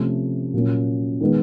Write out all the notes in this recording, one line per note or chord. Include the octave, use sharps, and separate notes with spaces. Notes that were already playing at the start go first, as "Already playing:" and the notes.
Already playing: C3 F3 A3 C#4
A#2 F#3 A#3 C#4
D#3 G#3 B3